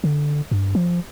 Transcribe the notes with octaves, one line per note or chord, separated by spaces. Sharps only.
D3
G2
F3